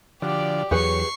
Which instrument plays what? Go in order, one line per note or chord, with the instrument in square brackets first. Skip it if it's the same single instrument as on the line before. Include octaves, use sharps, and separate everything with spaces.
[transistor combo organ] D3 F3 [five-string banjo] F#4 [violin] G4 D5
[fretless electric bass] E2 F#3 [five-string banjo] G4 G#4 B4 [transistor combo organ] C#5 [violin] C#6 C7